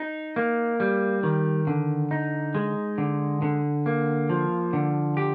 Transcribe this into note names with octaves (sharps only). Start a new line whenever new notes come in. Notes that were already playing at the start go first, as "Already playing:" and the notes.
Already playing: D#4
A#3
G3
D#3
D3
D#4
G#3
D3
D3
A#3
F3
D3
G4